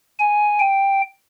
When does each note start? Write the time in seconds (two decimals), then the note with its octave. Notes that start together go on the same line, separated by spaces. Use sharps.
0.19 G#5
0.60 G5